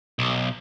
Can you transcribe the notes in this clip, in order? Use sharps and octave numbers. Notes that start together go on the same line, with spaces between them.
B1